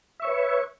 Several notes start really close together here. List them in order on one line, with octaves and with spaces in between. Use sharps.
E5 C#6 C#5 B4